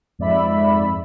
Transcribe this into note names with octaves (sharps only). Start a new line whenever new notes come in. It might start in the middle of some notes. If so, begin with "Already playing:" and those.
F2 G#2 D5 E5 B5